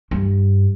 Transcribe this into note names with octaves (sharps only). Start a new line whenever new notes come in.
G2